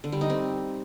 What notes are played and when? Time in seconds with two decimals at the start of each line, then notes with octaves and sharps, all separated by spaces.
0.04 D3
0.12 G3
0.21 D#4
0.30 C4